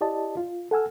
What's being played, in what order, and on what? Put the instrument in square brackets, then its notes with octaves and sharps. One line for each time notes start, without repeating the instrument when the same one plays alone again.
[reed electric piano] E4 G4 D5 D#5 A5
F4
A4 F#5 G#5 E6 F6